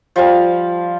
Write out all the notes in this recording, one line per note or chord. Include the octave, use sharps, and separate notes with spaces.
F3 G3 F5